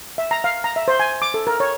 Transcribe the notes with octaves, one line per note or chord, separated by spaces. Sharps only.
E5
A#5
F5
A#5
E5
C5
G#5
D6
A4
A#4
C#5